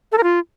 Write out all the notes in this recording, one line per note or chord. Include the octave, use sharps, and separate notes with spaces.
A4
A#4
F4